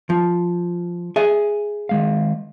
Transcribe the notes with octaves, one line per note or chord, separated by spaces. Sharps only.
F3
G#4 E5
D#3 G#3 F5